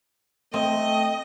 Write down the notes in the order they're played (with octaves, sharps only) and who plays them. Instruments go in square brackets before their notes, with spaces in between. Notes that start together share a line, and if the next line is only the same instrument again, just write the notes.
[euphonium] A3 [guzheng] C4 [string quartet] D#5